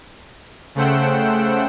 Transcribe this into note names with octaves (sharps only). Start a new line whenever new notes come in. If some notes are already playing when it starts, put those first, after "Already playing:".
C#3 A3 C5 F#5 G5 E6